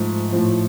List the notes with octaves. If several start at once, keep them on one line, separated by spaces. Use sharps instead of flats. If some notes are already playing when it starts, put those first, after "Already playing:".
Already playing: G#2 F3 A3
A2 F3